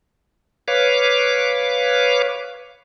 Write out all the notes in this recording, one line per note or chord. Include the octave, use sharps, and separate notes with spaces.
B4 C#5 F5 D6